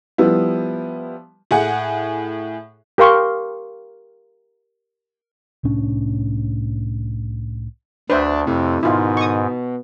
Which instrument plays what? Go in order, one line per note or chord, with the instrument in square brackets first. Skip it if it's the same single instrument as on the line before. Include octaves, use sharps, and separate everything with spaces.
[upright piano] F3 G3 B3 E4
[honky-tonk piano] A2 G#4 F#5
[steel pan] G4 A#4 F5 C6 C#6
[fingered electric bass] C2 A2 C#4 D4
[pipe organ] D2 [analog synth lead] D4 [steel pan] B4 C5 E5
[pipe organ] F2 [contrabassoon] A2 [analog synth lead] C3
[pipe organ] G#2 [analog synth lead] B2 [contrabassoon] D#3 [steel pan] E4 F4
[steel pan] C#6 D#6